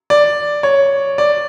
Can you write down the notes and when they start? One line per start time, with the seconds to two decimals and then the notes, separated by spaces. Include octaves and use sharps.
0.10 D5
0.63 C#5
1.18 D5